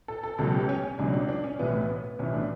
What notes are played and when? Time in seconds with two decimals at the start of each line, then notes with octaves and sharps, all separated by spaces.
0.08 A4
0.23 A4
0.38 C#2 B2 F#3 A4
0.54 G4
0.69 C#4
0.83 C#4
0.99 C#2 B2 F#3 D4
1.13 D4
1.29 D4
1.44 C#4
1.59 B1 A2 E3 B3
1.90 B3
2.19 B1 A2 E3 C#4
2.34 D4